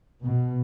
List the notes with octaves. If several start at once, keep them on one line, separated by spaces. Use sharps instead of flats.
B2